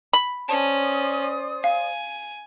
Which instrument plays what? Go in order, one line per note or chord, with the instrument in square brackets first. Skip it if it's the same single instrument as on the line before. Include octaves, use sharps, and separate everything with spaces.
[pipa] B5
[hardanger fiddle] C#4 [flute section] C5 D5 D#6 [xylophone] A5
[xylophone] F5 [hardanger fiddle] G#5